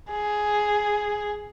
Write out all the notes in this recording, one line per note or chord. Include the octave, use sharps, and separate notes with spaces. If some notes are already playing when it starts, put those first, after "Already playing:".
G#4